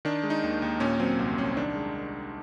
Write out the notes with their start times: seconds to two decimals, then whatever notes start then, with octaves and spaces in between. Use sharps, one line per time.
0.05 D#3 D4
0.23 G#3
0.30 D#4
0.43 D#2
0.62 D#2
0.80 A#2 C#4
0.99 F#3 C4
1.19 C2
1.38 C2 C#4
1.56 D#3 D4
1.76 G#3